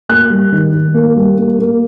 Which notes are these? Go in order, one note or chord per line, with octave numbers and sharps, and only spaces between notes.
A#3 F#6
G3
D#3
D#3
A#3
G3
A#3
A#3